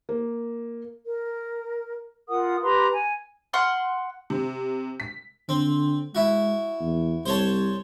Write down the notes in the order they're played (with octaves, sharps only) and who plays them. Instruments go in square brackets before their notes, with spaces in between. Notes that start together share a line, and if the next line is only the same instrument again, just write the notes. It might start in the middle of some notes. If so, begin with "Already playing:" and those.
[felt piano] A#3
[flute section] A#4
F4 A#4 F#5 D#6
G4 B4 A#5 C6
G#5
[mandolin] F#5 C6 F6
[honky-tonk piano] C3
B6
[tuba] D3 [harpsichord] C4
[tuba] G#3 [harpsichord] E4 F#4
[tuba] E2
[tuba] C2 [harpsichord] C5 C#5 A5